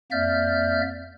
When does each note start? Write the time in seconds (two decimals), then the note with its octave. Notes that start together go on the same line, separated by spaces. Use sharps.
0.12 F2 A#3 D5 E5 F6 G6